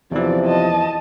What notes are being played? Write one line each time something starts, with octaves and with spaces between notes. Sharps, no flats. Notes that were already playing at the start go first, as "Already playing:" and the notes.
B1 E2 C3 E3 F3 D5
D#5 A5